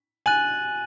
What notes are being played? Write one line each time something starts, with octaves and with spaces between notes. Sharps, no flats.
G#5 F#6 A6 D#7 F#7